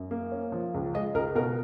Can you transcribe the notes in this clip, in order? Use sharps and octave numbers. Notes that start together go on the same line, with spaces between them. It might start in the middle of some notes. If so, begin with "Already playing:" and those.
Already playing: F#2
A#3
C#4
F3
C#2
G#3 D#5
C#2 A#4
B2 A#4